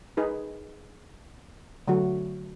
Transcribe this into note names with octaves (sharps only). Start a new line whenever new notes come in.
D#4 G#4 B4
D3 F#3 A3 F#4